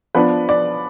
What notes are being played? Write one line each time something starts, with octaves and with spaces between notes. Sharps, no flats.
F3 B3 D4 B4
D5